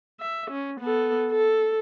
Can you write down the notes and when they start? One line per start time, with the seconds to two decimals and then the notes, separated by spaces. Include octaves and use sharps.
0.20 E5
0.51 C#4
0.81 B3 A4
1.32 A4